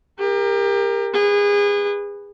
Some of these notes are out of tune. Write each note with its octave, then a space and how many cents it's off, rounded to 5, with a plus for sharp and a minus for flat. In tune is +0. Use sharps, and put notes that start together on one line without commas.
G4 +30 A#4 +0
G#4 -30 B4 +0